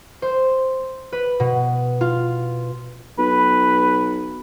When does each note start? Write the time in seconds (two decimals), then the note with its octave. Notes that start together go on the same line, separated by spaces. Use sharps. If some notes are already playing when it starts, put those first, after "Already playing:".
0.22 C5
1.12 B4
1.40 B2
2.01 F4
3.19 B1 B4